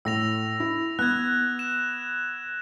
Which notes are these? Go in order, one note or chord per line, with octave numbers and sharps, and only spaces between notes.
A2 E6 A#6 F7
E4
B3 F#6 G#6
E7